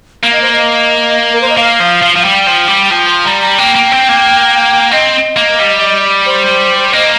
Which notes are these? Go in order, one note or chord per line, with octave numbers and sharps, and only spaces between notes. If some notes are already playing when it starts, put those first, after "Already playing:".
A#3 F5
D#5
C5
D#5
A#4
C5
D#5
A#3 F5
F3
F3
F3 F5
G3 G5
F3
G3
F3 G5
C6
G3 A#5
A#5
A#3 G5
A#3
C4
A#3
C4 D#5
A#3
G3
C5
A#3 D#5